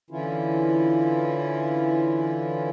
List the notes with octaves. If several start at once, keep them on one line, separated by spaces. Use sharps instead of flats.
D3 E3 C#4 E4 F4